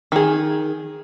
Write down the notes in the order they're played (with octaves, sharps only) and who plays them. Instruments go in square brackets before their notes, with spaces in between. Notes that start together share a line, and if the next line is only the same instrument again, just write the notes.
[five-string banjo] D#3 G#4